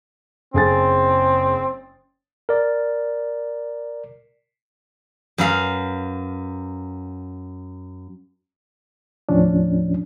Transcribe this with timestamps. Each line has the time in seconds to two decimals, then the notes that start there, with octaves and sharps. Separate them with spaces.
0.54 F#1 C4 G#4 A6
2.49 A#4 D5
5.38 F#2 B4 F5
9.29 D#2 A2 F3 C#4 D4